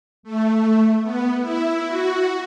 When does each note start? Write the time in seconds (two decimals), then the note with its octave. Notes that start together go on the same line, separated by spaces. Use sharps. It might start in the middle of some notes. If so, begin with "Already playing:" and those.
0.23 A3
1.01 B3
1.40 E4
1.87 F#4